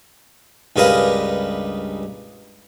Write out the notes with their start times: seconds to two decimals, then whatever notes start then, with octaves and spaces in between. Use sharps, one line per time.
0.76 C#2 G2 G#4 A#4 B4 F5